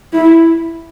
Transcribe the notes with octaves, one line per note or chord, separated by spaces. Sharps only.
E4